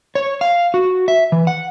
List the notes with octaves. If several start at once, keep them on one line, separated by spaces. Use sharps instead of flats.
C#5
F5
F#4
E5
E3
F#5